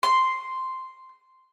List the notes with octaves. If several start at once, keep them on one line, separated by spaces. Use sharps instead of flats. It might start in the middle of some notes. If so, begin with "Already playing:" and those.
C6